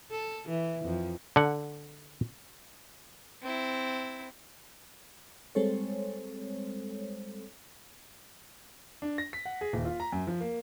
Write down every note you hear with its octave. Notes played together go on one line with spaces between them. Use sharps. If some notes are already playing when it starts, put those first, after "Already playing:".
A4
E3
F2
D3 F#5
C4 E4
G3 G#3 C4 A4 C5 C#5
D4
A#6
B6
F#5
G#4
D#1
F4
A#5
F#2
F3
A#3